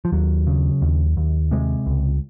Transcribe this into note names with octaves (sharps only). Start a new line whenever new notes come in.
F3
D#2 F#3
C#3
D#2
D#2
C3 G#3
C#2